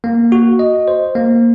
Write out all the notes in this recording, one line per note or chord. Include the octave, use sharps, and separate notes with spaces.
A#3
F#4
D#5
C5
A#3